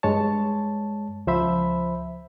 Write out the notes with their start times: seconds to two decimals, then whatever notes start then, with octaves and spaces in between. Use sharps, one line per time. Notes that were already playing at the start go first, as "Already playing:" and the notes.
0.03 G2 G#3 C#5 A5
1.27 C#2 F3 C5 E5 B5